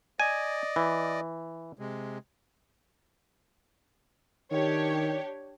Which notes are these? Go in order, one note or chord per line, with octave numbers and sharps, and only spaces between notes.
D5 D#5 G#5
E3
C3 G#3
D#3 D4 G4 C#5